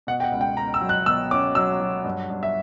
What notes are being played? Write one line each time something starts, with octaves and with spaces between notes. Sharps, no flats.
B2 F#5
G5
F#5
C#2
G5
B2 A#5
E6
F#3
F#6
B2 E6
C#4 D6
F#3 E6
F#3
G2
G2
E5